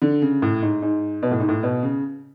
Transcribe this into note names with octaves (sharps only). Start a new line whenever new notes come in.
D3
C#3
A2
G#2
G#2
B2
A2
G#2
A2
B2
C#3